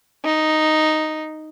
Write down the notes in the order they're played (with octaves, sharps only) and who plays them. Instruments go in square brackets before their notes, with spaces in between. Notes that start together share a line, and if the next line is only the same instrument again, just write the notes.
[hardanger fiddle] D#4